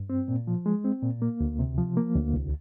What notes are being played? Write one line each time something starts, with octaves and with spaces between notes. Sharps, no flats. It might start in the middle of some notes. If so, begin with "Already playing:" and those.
Already playing: G2
C4
A#2
F3
G#3
C4
A#2
A#3
D2
C3
F3
A#3
D2
C2